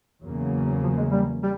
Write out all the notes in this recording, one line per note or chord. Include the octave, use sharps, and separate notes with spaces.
E2 C#3 F#3 A#3
F3
G#3
G3
G3